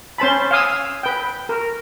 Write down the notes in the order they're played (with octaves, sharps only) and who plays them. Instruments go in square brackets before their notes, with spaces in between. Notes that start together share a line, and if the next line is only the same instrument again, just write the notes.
[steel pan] C#4 C5 A5 B5
F5 G#5 D#6 E6
B4 G5
A#4